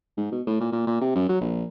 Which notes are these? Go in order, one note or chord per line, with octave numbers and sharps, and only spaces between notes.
G#2
B2
A2
A#2
A#2
A#2
C3
F#2
F#3
A#1